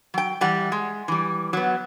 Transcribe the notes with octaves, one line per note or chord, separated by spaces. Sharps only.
F#3 G5
E3 G3 F#5
G#3
E3 G3
F#3 B3